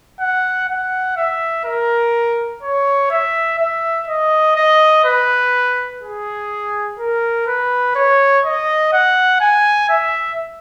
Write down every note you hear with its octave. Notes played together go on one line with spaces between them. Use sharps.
F#5
F#5
E5
A#4
C#5
E5
E5
D#5
D#5
B4
G#4
A#4
B4
C#5
D#5
F#5
G#5
E5